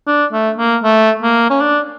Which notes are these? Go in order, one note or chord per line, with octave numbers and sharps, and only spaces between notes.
D4
A3
A#3
A3
A#3
C#4
D4